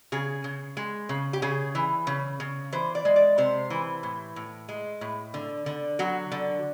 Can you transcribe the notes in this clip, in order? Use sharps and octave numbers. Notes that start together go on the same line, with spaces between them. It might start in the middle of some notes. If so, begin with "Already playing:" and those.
C#3 G#4
C#3
G#3
C#3
G4
C#3 G#4
E3
C#3
C#3
E3 C5
D5
G#3
D5
C3 C5
E3
A2
A2
G#3
A2
D3
D3
F#3 F#4
D3